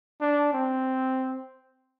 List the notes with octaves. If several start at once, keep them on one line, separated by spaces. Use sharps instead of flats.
D4
C4